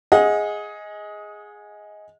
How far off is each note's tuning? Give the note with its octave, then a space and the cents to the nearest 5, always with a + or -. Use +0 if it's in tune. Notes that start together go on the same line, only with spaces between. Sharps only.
G#4 +0 D#5 +15 F#5 -40